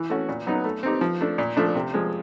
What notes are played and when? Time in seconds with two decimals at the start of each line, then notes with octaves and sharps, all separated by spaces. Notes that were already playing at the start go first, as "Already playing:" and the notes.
Already playing: E3
0.10 A3 C#4 F#4
0.29 A#2
0.47 F#3 B3 D#4
0.64 A3
0.83 C4 D#4 G4
1.01 F3
1.21 A3 D4
1.38 A#2
1.57 F3 A3 D4
1.75 C3
1.94 F3 G#3